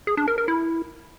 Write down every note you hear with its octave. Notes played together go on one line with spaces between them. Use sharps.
G#4
D4
A#4
A#4
E4